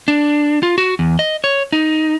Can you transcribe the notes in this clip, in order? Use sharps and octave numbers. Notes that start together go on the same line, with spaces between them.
D4
F4
F#4
E2
D#5
C#5
D#4